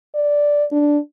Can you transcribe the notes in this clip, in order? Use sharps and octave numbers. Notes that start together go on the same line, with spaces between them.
D5
D4